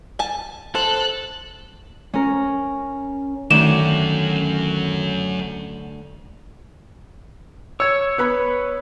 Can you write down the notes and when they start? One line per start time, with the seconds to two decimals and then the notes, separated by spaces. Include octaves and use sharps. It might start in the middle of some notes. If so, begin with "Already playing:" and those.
0.19 G#5 A5
0.75 A4 C5 F#6
2.13 C#4 A#4
3.51 D2 D#3 F#3 C#4 G5 D6 E7
7.80 C#5 E6 G#6
8.18 B3 B4 B5